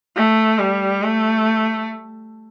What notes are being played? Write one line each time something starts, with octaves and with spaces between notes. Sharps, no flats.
A3
G3
A3